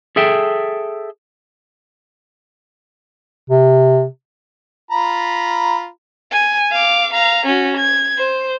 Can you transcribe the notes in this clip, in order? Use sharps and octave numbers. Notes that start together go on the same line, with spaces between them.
G#4 A4 E5 G5
C3
F4 A#5 B5
G#5
F5 D6
F5 A#5
C#4 F#4
G#6
C5